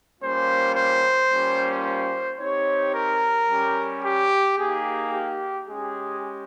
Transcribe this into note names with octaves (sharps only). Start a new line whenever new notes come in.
G3 A#3 C#4 F4 C5
C5
G3 A#3 C#4 F4
C5
C4 D#4 G4 C#5
A#4
G3 C#4 G4
G4
A#3 D#4 G4 G#4
G4
G#3 C#4 G4 G#4